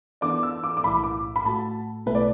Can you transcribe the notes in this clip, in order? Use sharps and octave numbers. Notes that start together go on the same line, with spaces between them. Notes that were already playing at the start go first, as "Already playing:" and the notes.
E3 B3 D4 A4 D5 D6
E6
D6
D6
B1 A2 E3 A3 E4 B5
D6
B5
A2 A3 F#4 A5
B1 B2 A3 E4 A4 B4
D5